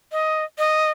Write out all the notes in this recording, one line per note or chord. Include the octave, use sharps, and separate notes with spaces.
D#5
D#5